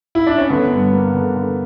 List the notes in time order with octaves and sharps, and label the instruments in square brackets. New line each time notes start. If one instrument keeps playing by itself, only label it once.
[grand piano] E4
D4
C#4
D3 B3
G2
A#3
D3
D3